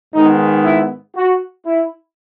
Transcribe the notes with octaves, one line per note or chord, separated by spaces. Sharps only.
G#2 D#3 G#3 B3 D#4
E4
F#4
E4